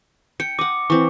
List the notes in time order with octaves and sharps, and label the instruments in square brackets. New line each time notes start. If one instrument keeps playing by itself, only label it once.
[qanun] G5 [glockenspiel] C#7
[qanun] D#5 F#5 [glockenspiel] D6
[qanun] E3 C4 [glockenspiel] C#6